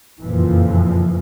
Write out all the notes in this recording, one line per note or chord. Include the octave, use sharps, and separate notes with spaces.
F#1 F2 A#2 E3 F3